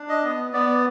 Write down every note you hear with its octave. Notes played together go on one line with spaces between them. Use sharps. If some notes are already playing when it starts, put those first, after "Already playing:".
Already playing: D4
D#5
B3
B3 D5